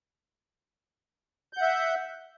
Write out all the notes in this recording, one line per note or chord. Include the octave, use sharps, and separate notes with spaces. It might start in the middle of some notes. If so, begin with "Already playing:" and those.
E5 F#5 G6